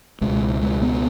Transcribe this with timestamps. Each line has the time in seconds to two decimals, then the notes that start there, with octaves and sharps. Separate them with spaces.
0.21 C#2 B2 G#3
0.62 G#3
0.82 B3